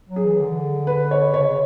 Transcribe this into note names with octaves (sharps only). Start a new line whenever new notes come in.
F#3
G#4
E3
E3
D3
B4
C#5
C#3 C#5